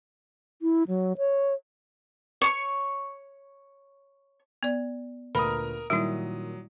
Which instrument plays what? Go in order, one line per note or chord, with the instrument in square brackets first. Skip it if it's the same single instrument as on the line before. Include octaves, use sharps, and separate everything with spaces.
[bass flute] E4
F#3
C#5
[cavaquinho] C#5 C#6
[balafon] B3 D5
[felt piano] D2 A#2 B4 [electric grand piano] A#4 A#5 D#6 [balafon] B5
[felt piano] A#2 D#3 [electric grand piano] F#3 D#6 [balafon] G3 E4